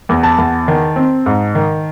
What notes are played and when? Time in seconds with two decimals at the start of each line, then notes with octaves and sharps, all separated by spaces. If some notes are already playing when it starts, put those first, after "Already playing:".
0.09 E2
0.23 A5
0.38 E2
0.68 D#3
0.96 C4
1.26 G#2
1.55 D#3